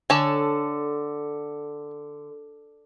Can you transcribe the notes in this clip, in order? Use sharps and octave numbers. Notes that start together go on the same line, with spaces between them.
D3 A4 C#5 G#5